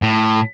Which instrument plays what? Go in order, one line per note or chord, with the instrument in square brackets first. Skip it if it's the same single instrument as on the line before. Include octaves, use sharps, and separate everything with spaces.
[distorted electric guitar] A2